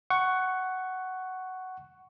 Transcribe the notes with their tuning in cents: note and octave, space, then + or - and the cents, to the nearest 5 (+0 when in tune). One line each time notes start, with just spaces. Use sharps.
F#5 +10 C#6 +0